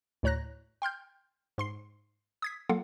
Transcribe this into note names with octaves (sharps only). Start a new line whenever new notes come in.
D2 A2 C#5 A#5 F#6 A#6
G5 C6 F6 G6
G#2 C6 C7
D#6 G#6 B6
F#3 A#3 F4 A4 F5 F#5